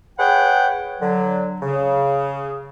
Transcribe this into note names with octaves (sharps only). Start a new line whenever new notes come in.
G#4 B4 C#5 F#5 G5
D3 F#3
C#3